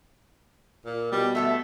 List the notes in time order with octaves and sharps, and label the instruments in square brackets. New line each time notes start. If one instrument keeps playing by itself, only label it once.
[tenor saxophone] A#2
[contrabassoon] B2 [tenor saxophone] G3
[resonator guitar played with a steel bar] A3 B3 A4 [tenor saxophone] E5